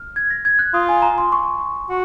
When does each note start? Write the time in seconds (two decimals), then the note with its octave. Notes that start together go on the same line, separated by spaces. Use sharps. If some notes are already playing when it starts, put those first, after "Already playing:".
Already playing: F6
0.16 G#6
0.30 A#6
0.45 G#6
0.59 F#6
0.74 F4 D#6
0.89 G#5
1.02 A#5
1.18 C6
1.32 C#6
1.90 F#4